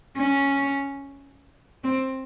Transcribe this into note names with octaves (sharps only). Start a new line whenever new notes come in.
C#4
C4